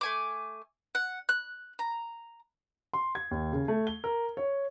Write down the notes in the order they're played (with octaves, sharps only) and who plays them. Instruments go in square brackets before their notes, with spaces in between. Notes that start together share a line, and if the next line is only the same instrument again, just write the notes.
[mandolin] A3 G#5 D6
F#5
F#6
A#5
[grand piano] C6
G#6
D#2
C#3
A3
G7
A#4
C#5